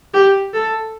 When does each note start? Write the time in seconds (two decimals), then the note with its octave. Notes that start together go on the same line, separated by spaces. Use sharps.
0.14 G4
0.53 A4